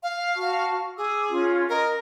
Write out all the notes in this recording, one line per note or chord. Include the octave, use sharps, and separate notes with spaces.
F5
F#4 A5 C#6
G#4 D6 E6
C#4 F4
A#4 D#5